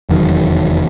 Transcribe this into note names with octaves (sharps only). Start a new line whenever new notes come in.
F1 E2 D#3 F#3